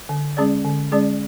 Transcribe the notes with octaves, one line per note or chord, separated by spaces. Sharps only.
D3
G#3 C#4 G#4 D5
D3
G#3 C#4 G#4 D5